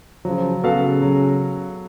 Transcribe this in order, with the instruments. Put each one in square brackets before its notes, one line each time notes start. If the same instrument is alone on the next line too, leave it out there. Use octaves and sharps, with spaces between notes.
[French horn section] C#3 F3 [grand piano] F#3
[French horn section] C#3 [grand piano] B3 F#4 A4 F5
[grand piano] F#3